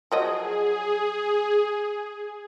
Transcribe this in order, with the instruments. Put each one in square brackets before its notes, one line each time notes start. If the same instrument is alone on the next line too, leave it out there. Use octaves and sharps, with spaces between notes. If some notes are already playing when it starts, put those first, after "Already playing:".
[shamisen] F3 F#3 D#5 [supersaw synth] G#4